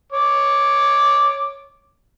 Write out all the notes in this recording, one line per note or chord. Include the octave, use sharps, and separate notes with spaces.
C#5 D6